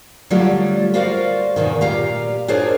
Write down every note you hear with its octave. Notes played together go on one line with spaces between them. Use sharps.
D3 F#3 G3 A3 F4 D5
F4 F#4 A#4 C5 D5 F5
E2 G2 B2 D#3
A#2 F4 G4 F5 A#5
D4 F4 G#4 A#4 C5 C#5